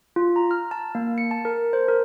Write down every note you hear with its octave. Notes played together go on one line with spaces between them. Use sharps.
F4
A#5
F6
A5
A#3
C#7
A5
A#4
C5
A#4